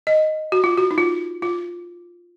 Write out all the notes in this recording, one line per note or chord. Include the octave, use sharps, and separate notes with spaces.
D#5
F#4
F4
F#4
D#4
F4
F4